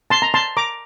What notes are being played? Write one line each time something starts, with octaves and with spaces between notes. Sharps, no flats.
A5 C6
A#5
A5 C6
A#5 D6